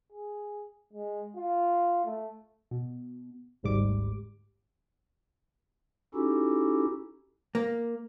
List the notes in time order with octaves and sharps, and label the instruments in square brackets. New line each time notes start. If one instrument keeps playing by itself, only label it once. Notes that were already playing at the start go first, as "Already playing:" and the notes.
[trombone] G#4
G#3
F4
A3
[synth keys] B2
G#1 D2 G#2 G3 D6
[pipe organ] C#4 D#4 E4 F#4 G4 A4
[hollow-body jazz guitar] A#3